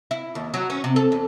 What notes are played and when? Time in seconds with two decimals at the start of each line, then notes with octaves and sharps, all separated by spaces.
0.11 E4
0.35 D#2
0.54 F#3
0.70 C#4
0.84 C3
0.96 A4
1.12 E2